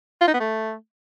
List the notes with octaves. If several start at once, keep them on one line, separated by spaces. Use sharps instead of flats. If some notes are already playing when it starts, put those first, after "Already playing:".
F4
D#4
B3
A3